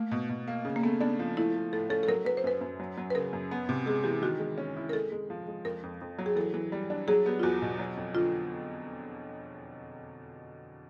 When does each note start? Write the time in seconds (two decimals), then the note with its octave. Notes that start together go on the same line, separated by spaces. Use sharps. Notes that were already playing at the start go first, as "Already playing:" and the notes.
Already playing: A3 A#3
0.11 B2
0.29 B2
0.47 A#3
0.65 C#3
0.76 A#3
0.83 A3 B3
1.01 B3 D4
1.19 F3
1.37 A3 E4
1.55 A3
1.73 A2 A4
1.90 C#4 A4
2.03 A4
2.08 F#3 A#4
2.25 F#3 B4
2.37 C5
2.44 F#2 B4
2.61 F#2
2.80 F#3
2.97 F#3
3.10 B4
3.15 C#3 A#4
3.33 F#2
3.51 B3
3.69 C3
3.86 G#3 G#4
4.04 E3 G4
4.22 D#3 F#4
4.39 G#3
4.58 C#4
4.76 E4
4.89 A#4
4.93 G#3 A4
5.12 G#3
5.30 F3
5.47 G#3
5.65 F2 A#4
5.83 F2
6.01 F2
6.19 F#3
6.26 G#4
6.36 E3 A4
6.54 E3
6.72 G3
6.90 D4
7.08 F#3 G#4
7.26 B3 G4
7.40 F4
7.43 E2 F#4
7.62 B2
7.79 F#3
7.97 F2
8.15 D3 F4